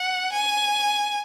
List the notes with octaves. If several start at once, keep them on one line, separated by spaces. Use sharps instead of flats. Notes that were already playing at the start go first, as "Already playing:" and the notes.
Already playing: F#5
G#5